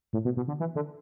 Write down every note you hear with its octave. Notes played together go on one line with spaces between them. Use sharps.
A2
B2
B2
D3
E3
D3